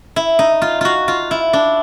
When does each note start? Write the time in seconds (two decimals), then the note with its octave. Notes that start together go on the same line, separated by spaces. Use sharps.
0.16 E4
0.39 D#4
0.62 F4
0.81 F4 F#4
1.08 F4
1.31 E4
1.53 D4